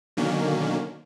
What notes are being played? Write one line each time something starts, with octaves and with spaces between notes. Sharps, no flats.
B2 D3 D#3 F#3 A#3 C#4